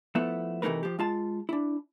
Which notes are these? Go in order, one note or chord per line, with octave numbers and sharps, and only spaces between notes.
F3 A3 B3 E4
C3 E3 A3 D#4 A#4 B4
F3 G4
G#3 F4 A5
D4 E4